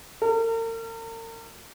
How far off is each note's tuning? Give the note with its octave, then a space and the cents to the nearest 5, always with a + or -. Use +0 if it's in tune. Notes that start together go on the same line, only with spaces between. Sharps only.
A#4 -40